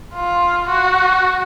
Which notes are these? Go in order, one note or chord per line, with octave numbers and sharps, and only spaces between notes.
F4
F#4